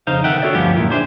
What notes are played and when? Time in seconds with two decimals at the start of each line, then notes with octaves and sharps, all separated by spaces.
0.07 F2 C#3 D#4 C5 F5
0.24 B1 D#3 A4 E5 F#5 G5
0.42 D4 F#4 A4 C#5 D5
0.55 D2 G2 F3 B3 C#4 G4
0.76 F#2 A#2 D#3 E4
0.91 D4 G4 G#4 C5